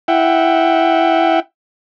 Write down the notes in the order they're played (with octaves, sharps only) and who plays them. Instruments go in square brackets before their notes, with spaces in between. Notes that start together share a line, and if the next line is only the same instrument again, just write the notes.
[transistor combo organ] E4 E5 F#5 G5